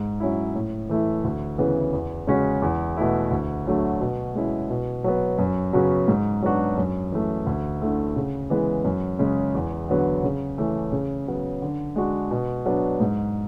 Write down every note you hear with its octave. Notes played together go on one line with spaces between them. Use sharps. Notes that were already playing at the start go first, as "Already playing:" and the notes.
Already playing: G#2
F#3 C#4 E4
A2
E3 A3 E4
D2
C#3 E3 B3
E2
C#3 G#3 C#4 F#4
E2
B2 A3 E4
D2
D3 F#3 A3
B2
G#3 C#4 E4
B2
F#3 B3
F#2
C#3 F#3 B3 F#4
G#2
F#3 B3 D4 F#4
F#2
E3 A3
D2
D3 A3 E4
C#3
E3 G#3 B3
F#2
C#3 G#3
E2
D3 F#3 B3
C#3
E3 A3 C#4
C#3
F#3 B3
D3
G#3 D4 F#4
B2
F#3 B3 D4
G#2